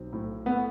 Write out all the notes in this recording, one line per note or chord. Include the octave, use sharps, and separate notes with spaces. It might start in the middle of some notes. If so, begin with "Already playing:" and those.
Already playing: B1 C4
A2
A3 B3